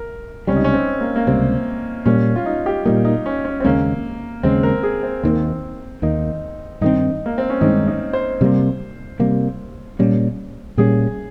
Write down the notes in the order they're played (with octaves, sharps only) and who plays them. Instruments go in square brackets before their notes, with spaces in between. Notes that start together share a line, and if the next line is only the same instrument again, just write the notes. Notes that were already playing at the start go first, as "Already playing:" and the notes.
Already playing: [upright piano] A#4
[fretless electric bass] C#2 C3 G3 [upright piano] C#4
[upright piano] D#4
C#4
C4
A#3
A#3
[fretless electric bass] C#2 C3 G3 [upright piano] C4
[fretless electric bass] A#2 G3 A#3 [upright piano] C#4
[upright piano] F4
D#4
G4
[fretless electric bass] A#2 G3 A#3 [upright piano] D#4
[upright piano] D#4
C#4
C#4
C4
[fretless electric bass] D#2 C#3 G#3 C#4 [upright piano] A#3
[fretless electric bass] D#2 C#3 G#3 C#4 [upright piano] C4
[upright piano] A#4
G#4
C4
[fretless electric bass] D#2 D#3 A#3 [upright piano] C4
[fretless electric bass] D#2 D#3 A#3 [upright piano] D#4
[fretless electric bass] G2 D#3 G#3 C4 [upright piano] D#4
[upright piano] A#3
C4
C#4
[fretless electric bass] G2 D#3 G#3 C4 [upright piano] D#4
[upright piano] D#4
C5
[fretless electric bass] C3 G3 A#3
C3 G3 A#3
A#2 G3 A#3 C#4
[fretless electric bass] A#2 G3 A#3 C#4 [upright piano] G#4